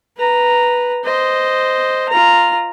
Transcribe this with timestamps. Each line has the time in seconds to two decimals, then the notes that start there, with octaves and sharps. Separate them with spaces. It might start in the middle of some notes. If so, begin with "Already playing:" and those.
0.17 B4 A#5
1.04 C5 D#5
2.09 F4 A#5